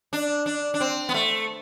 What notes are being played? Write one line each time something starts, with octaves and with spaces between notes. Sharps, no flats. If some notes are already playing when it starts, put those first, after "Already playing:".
D4
D4
D4
C4
B3
A3